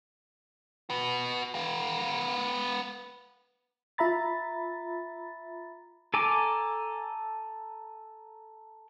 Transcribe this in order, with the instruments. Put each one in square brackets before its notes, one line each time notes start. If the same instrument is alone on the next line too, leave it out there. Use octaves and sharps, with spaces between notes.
[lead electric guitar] F#4 B4
B3 F5
[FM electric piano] F4 E5 A#5 B5 A6
[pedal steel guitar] A4 G#5 A#5 D6